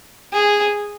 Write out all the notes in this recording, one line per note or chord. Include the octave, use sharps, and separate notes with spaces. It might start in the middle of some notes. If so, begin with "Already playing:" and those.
G#4